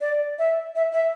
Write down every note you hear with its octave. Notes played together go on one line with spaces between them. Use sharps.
D5
E5
E5
E5